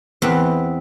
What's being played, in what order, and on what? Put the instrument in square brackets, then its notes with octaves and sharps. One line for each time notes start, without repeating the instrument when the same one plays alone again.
[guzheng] E2 B3 C4 B4